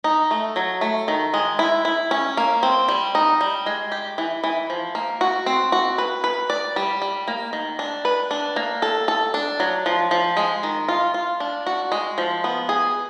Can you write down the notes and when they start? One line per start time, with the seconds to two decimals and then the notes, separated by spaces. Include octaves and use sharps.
0.04 D#4
0.31 A3
0.56 F#3
0.81 A3
1.08 D#3
1.34 G#3
1.59 E4
1.85 E4
2.11 C#4
2.37 A#3
2.63 C4
2.88 G3
3.15 D#4
3.41 G3
3.66 G#3
3.92 G4
4.18 E3
4.44 E3
4.70 F3
4.95 A#3
5.21 F#4
5.46 C4
5.72 F#4
5.98 B4
6.24 B4
6.50 D5
6.76 G3
7.02 G3
7.28 A#3
7.53 D#3
7.79 D4
8.05 B4
8.31 D4
8.56 A#3
8.82 A4
9.08 A4
9.34 D4
9.60 F#3
9.86 F3
10.11 F3
10.37 G#3
10.63 D#3
10.88 F4
11.14 F4
11.40 D4
11.66 F#4
11.92 G#3
12.18 F3
12.44 B3
12.69 G#4